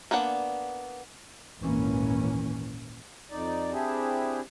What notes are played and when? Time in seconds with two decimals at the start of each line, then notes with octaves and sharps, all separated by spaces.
0.11 A#3 B3 D4 F#5
1.59 G#1 D#2 A#2 E3 A#3 C#4
3.31 F2 D#4 D5
3.72 C4 D4 E4 G4 G#4